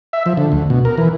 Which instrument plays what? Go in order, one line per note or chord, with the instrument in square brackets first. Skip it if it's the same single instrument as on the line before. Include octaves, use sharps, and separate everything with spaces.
[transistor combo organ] E5
F3
D3
D2
B2
A#4
E3